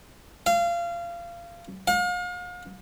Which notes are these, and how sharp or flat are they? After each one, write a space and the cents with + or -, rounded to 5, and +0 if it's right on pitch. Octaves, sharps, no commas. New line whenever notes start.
F5 -25
F5 +40